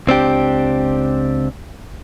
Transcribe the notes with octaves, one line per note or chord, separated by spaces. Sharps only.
C#2 C4 D4 G4